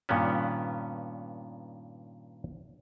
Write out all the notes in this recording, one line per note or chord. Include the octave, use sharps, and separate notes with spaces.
G2 A#2 D#3 B3 C#4